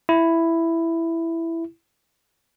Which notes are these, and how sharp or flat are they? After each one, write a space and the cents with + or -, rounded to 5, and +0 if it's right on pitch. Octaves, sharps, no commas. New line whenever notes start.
E4 +5